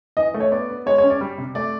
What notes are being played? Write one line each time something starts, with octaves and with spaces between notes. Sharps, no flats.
E3 D#5
A3
C#5
B3 D5
B3
G#3 C#5
C#5
C#4
D5
G3
C3
A3 D5